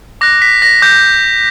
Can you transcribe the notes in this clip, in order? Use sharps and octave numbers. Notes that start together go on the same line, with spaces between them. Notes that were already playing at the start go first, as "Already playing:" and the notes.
D6 F#6 A#6
B6
A#6
D6 F#6 G6